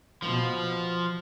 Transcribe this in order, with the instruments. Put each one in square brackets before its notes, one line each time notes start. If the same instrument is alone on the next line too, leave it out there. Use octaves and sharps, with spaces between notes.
[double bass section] B2 [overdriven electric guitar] F3